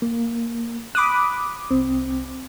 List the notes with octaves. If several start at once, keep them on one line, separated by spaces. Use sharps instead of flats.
A#3
B5 D6 D#6 F#6
C2 C4